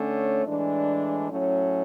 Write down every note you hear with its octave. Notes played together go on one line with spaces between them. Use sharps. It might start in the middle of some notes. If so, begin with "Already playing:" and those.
Already playing: D3 A3 C#4
A2 E3 G#3 D4
A2 F#3 C#4